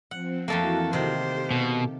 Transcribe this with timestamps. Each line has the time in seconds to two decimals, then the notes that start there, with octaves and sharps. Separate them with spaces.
0.11 F3 C4 F#5
0.48 F2 E3 A3 A#3 E4 F#4 A4
0.93 C3 D#3 G4 A4 C5
1.51 B2